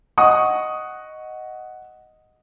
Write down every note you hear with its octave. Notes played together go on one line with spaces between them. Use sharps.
D#5 F#5 C#6 D#6